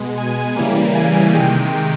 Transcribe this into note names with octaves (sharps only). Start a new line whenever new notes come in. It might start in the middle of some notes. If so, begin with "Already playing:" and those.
Already playing: B2 G#3
G#5
C#3 E3 G3 A#3
G#5
C3 D#3 G#3 G5